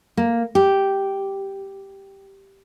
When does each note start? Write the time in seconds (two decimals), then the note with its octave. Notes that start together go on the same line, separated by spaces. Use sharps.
0.17 A#3
0.55 G4